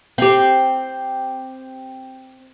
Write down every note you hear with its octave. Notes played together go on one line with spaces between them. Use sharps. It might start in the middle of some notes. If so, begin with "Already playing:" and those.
C4 G4